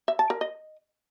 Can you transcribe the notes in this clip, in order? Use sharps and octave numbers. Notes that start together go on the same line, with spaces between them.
E5
A5
A#4
D#5